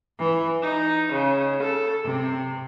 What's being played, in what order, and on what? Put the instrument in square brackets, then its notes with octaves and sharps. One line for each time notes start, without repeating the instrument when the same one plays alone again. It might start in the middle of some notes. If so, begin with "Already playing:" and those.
[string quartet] E3
D#4
C#3
A4
C3